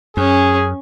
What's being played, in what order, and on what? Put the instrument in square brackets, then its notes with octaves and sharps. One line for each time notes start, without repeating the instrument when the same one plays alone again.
[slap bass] F#2 [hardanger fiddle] C#4 [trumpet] G#4